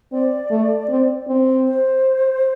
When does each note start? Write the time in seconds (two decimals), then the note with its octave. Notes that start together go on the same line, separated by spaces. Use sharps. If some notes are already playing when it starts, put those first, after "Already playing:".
0.12 C4 D5
0.50 A3
0.89 C4
1.28 C4
1.68 C5